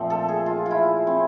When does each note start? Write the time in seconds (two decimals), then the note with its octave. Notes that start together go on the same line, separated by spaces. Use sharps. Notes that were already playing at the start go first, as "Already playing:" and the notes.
Already playing: A#2 F3 A3 C4
0.10 A4
0.28 G#4
0.46 F4
0.66 E4 F4
1.07 C4